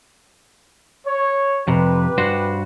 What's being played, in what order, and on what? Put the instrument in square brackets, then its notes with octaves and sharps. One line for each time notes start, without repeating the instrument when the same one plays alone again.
[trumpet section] C#5
[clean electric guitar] F2 C3 [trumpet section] G4 B4
[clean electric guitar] G2 F#4 C5